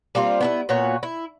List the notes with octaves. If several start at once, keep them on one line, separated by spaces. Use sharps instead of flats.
G3 A#3 C4 F4
B3 D4 E4
A#2 B3 F#4 C#5
E4